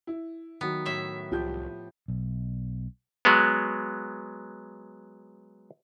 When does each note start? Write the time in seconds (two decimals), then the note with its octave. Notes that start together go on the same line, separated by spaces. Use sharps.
0.07 E4
0.61 D#3 F#3 B3
0.86 A2 E5
1.32 C2 F3 G4 G6
2.08 B1
3.25 F#3 G#3 B3